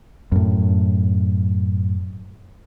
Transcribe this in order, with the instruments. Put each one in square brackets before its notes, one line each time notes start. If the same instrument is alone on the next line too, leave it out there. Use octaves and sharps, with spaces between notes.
[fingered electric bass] F#2 A2